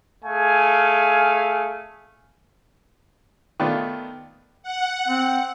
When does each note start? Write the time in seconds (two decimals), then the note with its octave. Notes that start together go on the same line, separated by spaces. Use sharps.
0.24 A3 G#4 F5 G#5
3.60 D#3 A3 B3 D4 F4
4.63 F#5
5.08 C4